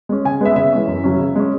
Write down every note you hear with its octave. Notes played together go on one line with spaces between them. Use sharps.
G#3 C#4
C#3 G#5
G#3 B3 E5
C#3 E5
E3 G#3 C#4
F#2
C#3 F#3 C#4
C#3
G#3 C#4